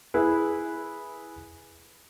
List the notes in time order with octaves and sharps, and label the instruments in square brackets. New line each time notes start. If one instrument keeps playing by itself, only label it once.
[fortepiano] E4 G#4 B4